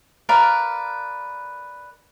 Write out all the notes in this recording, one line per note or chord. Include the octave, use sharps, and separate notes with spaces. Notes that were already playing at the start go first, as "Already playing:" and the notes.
A#4 B4 D5 F5